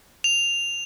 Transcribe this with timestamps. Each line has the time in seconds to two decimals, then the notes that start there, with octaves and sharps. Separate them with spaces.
0.24 F7